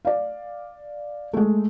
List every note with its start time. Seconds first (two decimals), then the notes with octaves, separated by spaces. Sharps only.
0.05 D5 F5
1.34 G#3 A3